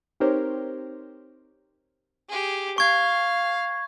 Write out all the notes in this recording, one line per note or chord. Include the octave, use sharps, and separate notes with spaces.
C4 D#4 G4 A#4 C5 C#5
G4 G#4
F5 C#6 G#6